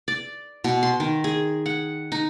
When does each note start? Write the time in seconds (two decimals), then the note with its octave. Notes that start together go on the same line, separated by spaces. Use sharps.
0.08 D5
0.64 B2
0.83 C6
1.00 D#3
1.24 G#4
1.66 F#5
2.12 D#4